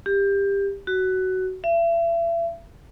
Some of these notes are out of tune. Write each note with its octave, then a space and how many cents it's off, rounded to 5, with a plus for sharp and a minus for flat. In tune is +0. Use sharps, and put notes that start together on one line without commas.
G4 +20
F#4 +15
E5 +35